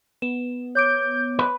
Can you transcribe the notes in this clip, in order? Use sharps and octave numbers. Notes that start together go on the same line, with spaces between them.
B3 E7
C#5 D6 G6 D7
B4